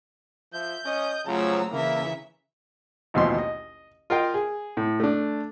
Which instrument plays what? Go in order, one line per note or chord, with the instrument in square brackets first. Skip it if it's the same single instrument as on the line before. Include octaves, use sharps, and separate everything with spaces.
[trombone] F3 [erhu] E5 [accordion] G6
[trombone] C#4 [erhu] D#5
[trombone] C#3 [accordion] F3 F#3 [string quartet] A3 E6 [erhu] A#5
[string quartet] C#3 E3 E5 [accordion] A#3 [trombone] E4
[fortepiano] A1 D#2 B2 F3 C6
D#5
F4 A#4 D#5 F5 G5
G#4
A2
A3 D4